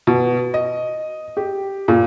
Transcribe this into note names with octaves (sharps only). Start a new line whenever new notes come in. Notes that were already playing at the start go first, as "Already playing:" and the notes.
B2
D#5
G4
A#2